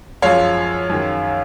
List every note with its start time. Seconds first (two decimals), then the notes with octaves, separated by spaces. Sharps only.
0.22 F#2 F3 G#3 C#5 F5
0.90 F#2 D#3 G#3